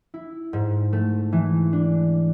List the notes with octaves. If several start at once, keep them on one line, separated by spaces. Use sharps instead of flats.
E4
G#2
A3
E3
D4